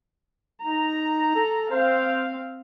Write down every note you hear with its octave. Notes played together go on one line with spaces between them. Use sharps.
D#4 A#5
A4
C4 C5 F5